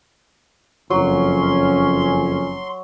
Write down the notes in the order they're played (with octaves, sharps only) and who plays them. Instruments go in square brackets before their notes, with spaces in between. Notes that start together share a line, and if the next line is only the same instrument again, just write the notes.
[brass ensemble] F#1 F2 C#4 [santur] F#3 [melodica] C6